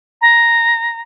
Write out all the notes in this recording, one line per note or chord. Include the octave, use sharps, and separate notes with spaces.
A#5